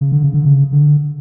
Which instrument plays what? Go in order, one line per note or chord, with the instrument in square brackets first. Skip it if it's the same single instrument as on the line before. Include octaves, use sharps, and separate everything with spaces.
[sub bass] C#3
D3
C#3
D3
C#3
D3